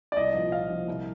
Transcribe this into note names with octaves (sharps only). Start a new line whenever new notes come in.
D5
C2 D#5
A#2 F3
C2 F5
A#2 F3
C2